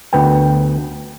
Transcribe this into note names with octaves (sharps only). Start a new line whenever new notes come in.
D2 B3 G5